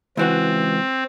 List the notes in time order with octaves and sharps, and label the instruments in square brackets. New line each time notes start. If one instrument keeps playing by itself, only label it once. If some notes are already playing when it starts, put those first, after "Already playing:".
[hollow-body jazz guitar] C#2 E3 F#4 [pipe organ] C4